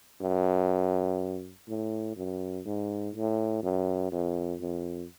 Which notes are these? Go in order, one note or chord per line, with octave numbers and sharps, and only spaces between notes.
F#2
A2
F#2
G#2
A2
F#2
F2
F2